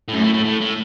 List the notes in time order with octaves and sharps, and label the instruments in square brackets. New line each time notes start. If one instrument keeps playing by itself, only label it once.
[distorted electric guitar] A2
[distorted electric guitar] F#2 [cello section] A3
[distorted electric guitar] A2
A2
A2
A2